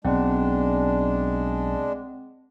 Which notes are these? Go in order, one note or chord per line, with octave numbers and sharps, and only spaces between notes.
B1 G#3 C4 D4 F#5